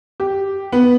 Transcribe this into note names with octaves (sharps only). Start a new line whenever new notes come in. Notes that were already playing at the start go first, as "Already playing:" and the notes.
G4
B3